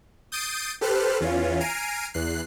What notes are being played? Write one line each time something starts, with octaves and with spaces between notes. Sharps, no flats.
D#6 G6 A6 C7 D7 D#7
G4 A4 B4 C5 F6 F#6
E2 E3 C#4 F4
G#5 A#5 F6 C7 D7 D#7
E2 F#6 C7